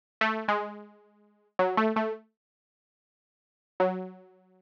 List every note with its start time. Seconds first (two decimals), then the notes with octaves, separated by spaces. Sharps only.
0.21 A3
0.48 G#3
1.59 F#3
1.77 A3
1.96 A3
3.80 F#3